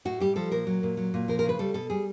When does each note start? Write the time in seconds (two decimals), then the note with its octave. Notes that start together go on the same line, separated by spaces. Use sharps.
0.05 A2 F#4
0.20 G3 G4
0.36 F3 A4
0.52 A#2 A#4
0.67 F#3
0.83 A#2
0.97 F#3
1.14 A#2
1.28 F3 A#4
1.39 A#4
1.44 C#3
1.49 B4
1.59 G3 A4
1.74 B2 A4
1.90 G3 G#4